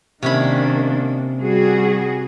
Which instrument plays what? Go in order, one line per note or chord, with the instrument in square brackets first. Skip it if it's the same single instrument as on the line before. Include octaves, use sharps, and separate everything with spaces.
[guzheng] C3 C#4 B5 [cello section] D#3 A#3 D4
[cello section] G3 F#4 G#4